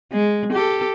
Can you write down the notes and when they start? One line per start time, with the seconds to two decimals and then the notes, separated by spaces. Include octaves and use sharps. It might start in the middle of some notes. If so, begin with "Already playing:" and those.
0.13 G#3
0.53 G4 A4